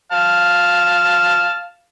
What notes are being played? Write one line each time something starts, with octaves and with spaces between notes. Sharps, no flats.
F5 A5